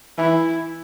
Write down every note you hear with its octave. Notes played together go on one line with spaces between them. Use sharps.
E3 E4